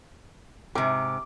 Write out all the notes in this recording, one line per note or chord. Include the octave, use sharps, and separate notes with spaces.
G#2 C3 D6